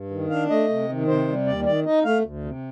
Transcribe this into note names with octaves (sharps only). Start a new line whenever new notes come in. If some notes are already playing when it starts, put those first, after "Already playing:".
Already playing: G2
D#3
D4 F5
A3 D#5
C3
D#3
C3 C5
G3
D#2 D5
D#3 D5
D#4 D#5
A3 F5
D2
C3